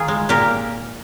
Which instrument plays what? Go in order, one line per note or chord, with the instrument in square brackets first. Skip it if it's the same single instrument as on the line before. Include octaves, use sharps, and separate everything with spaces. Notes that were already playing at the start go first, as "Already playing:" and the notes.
Already playing: [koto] D#3 F4 G#4
G#3
A#2 G4 A#4